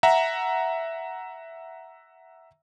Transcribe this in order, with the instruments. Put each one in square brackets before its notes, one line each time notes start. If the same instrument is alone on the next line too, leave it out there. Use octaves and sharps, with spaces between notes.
[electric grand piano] E5 F#5 A#5